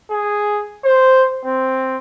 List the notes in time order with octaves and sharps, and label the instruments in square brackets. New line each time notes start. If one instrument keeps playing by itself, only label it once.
[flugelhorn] G#4
C5
C4